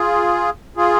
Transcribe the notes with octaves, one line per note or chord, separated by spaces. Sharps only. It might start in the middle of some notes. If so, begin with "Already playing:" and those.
Already playing: F4 G#4
F4 G#4